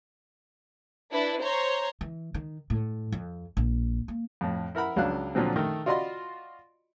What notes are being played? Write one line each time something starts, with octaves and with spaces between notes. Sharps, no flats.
D4 E4 B4
C5 C#5 A#5 C6
E3
D#3
A2
F2
A#1
A#3
F2 A2
E4 A#4 F#5 B5
C#2 F#3 D4 F5 F#6
A#2 D3 F3 F#3 C4
D#3 A3 A#4
F4 F#4 D5 D#5 B5 C6